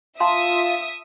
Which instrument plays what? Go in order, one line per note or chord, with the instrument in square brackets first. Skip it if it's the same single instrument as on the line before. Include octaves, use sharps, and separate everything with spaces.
[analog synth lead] F4 [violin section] E5 D#6 [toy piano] A5 A#5 C6